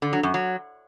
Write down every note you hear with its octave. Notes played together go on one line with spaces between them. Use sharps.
D3
F#3
F#2
F#3